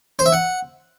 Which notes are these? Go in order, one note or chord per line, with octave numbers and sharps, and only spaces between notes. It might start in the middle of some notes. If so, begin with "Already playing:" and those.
C5
E5
F#5